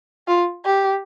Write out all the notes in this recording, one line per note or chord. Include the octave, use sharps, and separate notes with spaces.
F4
G4